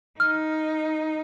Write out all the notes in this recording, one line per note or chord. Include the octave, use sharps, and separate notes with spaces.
D#4 F6